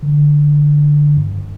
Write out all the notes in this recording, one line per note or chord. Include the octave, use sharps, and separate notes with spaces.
D3
G2